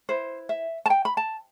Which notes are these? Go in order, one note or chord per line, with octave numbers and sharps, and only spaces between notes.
E4 B4 C5
E5
A5
G5
B5
A5